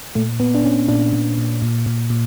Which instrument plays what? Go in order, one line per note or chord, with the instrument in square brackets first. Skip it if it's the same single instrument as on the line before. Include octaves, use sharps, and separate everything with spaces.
[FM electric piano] A#2 A3
A#2 B3
D4
A#2 C#4
A#2 D4
A#2
A#2
A#2
A#2
A#2